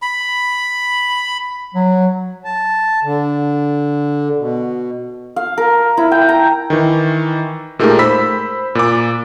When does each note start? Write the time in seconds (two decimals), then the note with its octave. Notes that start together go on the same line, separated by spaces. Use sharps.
0.02 B5
1.74 F#3
2.45 A5
3.03 D3
4.37 B2
5.36 F5
5.58 A#4
5.97 E4
6.12 G5
6.29 A#5
6.70 D#3 E3
7.79 A#2 G#3 A3 D#4 G4 A#4
7.99 C5 B5 E6 B6
8.75 A#2 D6